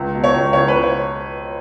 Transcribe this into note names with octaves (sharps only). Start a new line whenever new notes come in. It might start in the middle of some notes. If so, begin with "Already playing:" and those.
Already playing: C#2
B2
C#5
C#2
C#2 C#5
B4
C#2
C#5